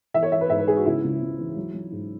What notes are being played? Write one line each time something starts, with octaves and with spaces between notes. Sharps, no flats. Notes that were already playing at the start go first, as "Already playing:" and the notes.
E3 E5
C#5
E3 E5
B4
G#2 E5
B4
G#2 G#4
F#4
C#3 E4
C#2
C#2
E3
F#3
F#3
G#2